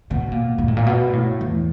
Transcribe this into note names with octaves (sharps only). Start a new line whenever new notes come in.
B2
A#2
A#2
A2
A#2
B2
A2
E2